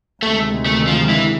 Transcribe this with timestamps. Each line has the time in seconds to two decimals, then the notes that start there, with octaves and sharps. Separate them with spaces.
0.22 D2 C3 D#3 G#3 A3
0.66 A3
0.87 F3
1.09 E3